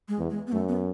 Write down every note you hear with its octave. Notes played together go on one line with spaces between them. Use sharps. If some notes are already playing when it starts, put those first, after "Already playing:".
G#3
E2
G#3
B3
F#2 A3
B3